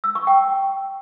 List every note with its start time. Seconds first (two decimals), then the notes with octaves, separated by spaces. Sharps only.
0.04 E6
0.15 C#6
0.27 G5